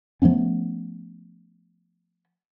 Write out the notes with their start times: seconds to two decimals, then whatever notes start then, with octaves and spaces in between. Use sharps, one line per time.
0.22 F3 A3 B3 C#4